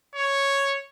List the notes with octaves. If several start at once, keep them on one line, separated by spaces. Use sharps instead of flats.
C#5